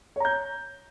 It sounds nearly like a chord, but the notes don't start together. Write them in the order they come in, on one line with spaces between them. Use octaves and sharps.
C#5 A#5 G6